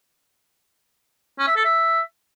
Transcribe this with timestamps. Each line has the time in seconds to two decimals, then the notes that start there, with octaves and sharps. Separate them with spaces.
1.39 C#4
1.47 E5
1.56 A4
1.65 E5